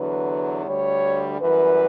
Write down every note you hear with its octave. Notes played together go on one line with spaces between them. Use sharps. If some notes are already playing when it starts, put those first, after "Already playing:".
Already playing: E2 D3 F#3 B4
D2 D3 G3 C#5
F#2 E3 G3 B4